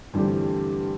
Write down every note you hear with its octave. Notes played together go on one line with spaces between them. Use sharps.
G2 D3 E3 A3 C4 G4